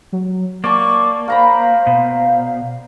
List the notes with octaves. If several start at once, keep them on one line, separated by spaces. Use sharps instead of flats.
F#3
A#3 D5 A5 C#6 D6
A#4 C5 F5 A#5 B5
B2